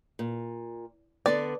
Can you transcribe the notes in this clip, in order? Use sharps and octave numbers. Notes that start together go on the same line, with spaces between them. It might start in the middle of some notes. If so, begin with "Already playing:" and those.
A#2
D3 B3 D4 D5